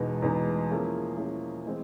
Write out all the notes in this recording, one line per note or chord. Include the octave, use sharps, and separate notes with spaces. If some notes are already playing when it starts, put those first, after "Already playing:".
Already playing: E2 B2 G#3 B3 D#4
E2 B2 G#3 B3 D#4
F3 A#3 C#4 E4 G#4
F3 A#3 C#4 E4 G#4
E3 G#3 C4